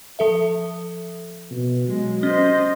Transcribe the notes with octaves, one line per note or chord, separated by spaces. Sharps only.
F3 A4 E5
B2
F#3 G#3
C#4 C5 D#5